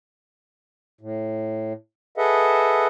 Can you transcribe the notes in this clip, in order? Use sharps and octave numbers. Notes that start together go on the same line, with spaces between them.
A2
G#4 A4 B4 D#5 E5 F#5